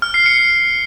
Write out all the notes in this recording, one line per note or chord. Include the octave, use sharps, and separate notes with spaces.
F6
C7
C#7